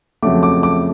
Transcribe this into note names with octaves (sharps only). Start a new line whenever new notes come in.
F2 C#3 F#3 A3 D6
D6
D6